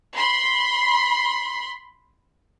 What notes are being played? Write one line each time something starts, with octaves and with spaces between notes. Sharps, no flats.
B5 C6